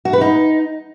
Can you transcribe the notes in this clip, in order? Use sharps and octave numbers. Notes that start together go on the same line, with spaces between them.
F#4
B4
D#4